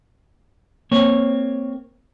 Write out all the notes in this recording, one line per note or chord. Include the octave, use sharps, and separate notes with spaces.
A#3 C4 C#5